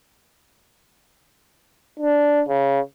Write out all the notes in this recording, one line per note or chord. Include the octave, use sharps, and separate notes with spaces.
D4
C#3